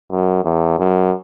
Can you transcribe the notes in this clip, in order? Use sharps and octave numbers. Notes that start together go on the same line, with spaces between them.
F#2
E2
F#2